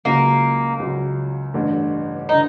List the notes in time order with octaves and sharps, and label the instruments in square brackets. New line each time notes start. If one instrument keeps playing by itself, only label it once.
[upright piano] C#2 C#3 F#3 [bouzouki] A#3
[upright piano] C#2 C#3 F#3
A1 G2 D3
[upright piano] D3 [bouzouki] D#4